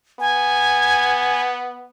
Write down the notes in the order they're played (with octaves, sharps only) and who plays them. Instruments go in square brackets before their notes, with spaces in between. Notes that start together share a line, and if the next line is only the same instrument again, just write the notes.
[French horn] B3 [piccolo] G#5